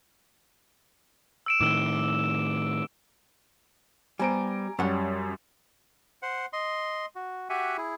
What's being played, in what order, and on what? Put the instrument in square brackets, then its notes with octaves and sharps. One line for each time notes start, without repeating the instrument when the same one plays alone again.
[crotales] E6 D7 E7
[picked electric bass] A2 D#3 [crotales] D6 E6 G7
[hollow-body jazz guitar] G3 B3 C5 [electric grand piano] G#5 A#5 D7
[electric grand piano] F#2 G3 [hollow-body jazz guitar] C#4 F#5
[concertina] C5 F#5
D#5 C6
F#4
F#4 G4 E5 F#5 G#5
E4 G#4